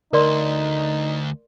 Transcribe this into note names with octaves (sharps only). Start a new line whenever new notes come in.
D2 D#4 A#4 D5 C6